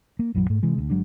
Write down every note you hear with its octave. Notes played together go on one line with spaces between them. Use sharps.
A#3
A#1 F#2 E3 F#3
G#2 A3
C3 E3 G#3
D2
G1 F#3 G#3 D4